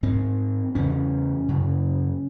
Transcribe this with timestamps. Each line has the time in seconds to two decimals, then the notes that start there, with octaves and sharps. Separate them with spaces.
0.03 G#2 C4
0.75 E2 C#3 C#4
1.48 F#2 C#3